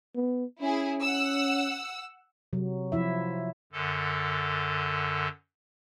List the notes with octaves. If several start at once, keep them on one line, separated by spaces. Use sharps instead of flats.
B3
C#4 E4 G#4
F#5 E6
C3 F#3
F3 E4 E5
F#2 D3 A4